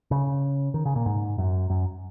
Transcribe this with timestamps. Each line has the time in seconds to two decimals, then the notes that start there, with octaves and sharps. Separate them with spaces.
0.11 C#3
0.74 D#3
0.85 C#3
0.96 A#2
1.06 G#2
1.38 F#2
1.70 F#2